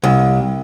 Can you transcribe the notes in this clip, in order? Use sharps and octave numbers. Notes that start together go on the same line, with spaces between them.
C2